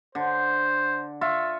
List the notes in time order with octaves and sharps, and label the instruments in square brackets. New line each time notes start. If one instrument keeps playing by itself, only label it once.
[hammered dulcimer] D3 [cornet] C5
[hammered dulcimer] F4 E5 C#6